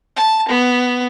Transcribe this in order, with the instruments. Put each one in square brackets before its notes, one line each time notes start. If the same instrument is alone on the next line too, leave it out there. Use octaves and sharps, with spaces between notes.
[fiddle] A5
B3